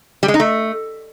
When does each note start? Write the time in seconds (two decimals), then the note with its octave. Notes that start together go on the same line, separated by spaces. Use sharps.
0.23 G3
0.28 G#3
0.34 D#4
0.40 A3